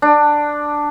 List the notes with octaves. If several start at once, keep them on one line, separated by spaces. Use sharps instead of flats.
D4